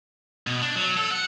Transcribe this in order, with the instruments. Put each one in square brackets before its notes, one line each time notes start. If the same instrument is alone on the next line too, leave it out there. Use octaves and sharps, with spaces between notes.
[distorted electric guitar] B2
D4
F#3
A4
F#5